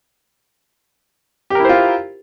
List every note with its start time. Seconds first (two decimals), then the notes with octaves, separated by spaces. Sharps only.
1.50 G4
1.55 A#4
1.60 E4
1.65 C5
1.69 F4